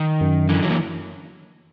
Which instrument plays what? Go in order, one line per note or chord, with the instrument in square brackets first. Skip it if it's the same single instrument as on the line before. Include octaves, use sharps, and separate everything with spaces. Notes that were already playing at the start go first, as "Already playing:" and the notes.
Already playing: [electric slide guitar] D#3
[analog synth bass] F#2
[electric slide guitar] D3 E3
E3 F#3
A#3